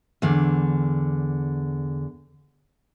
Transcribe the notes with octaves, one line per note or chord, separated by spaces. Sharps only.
E2 D3